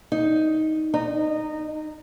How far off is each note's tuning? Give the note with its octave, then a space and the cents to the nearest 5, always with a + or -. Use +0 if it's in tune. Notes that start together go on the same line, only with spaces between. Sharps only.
D#4 +10
D#4 -15